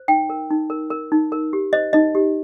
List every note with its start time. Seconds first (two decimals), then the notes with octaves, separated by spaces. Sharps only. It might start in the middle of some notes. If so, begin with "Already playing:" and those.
Already playing: C5
0.08 D#4 G5
0.30 A#4
0.50 D#4
0.70 A#4
0.90 A#4
1.12 D#4
1.32 A#4
1.53 G4
1.73 C5 D#5
1.93 D#4 D#5
2.15 G4